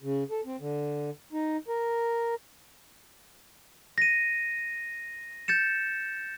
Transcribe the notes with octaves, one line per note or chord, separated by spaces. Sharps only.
C#3
A4
C4
D3
D#4
A#4
A#6 D#7
G6 A6 C#7 E7